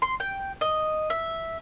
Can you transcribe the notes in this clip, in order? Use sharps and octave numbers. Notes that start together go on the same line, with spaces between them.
C6
G5
D#5
E5